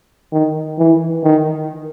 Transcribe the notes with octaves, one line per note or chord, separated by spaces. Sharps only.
D#3
E3
D#3